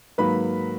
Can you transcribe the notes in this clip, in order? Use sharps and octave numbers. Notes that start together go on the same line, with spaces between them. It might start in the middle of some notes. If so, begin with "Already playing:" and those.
G#2 D#3 F#3 A#3 B4 B5